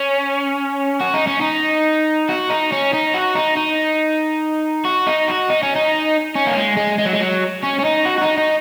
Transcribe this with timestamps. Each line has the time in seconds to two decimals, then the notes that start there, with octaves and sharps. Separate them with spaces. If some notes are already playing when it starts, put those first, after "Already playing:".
Already playing: C#4
1.01 F#4
1.14 D#4
1.27 C#4
1.41 D#4
2.29 F#4
2.50 D#4
2.72 C#4
2.93 D#4
3.14 F#4
3.35 D#4
3.57 D#4
4.85 F#4
5.07 D#4
5.28 F#4
5.50 D#4
5.63 C#4
5.76 D#4
6.35 C#4
6.46 A#3
6.56 G#3
6.77 G#3
6.99 G#3
7.06 F#3
7.13 G#3
7.20 F#3
7.63 C#4
7.79 C#4
7.84 D#4
8.05 F#4
8.18 F#4
8.21 D#4
8.37 D#4